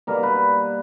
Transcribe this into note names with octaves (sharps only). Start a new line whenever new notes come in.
B2 G3 A#3 A#4
B4